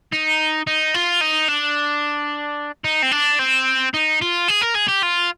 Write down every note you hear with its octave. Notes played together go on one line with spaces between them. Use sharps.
D#4
D#4
F4
D#4
D4
D#4
C4
D4
C4
D#4
F4
G#4
A#4
G#4
G4
F4